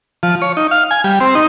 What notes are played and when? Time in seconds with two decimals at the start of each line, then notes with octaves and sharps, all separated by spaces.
0.23 F3
0.42 C#5
0.57 D#4
0.71 F5
0.91 G#5
1.04 G3
1.20 C4
1.35 D#4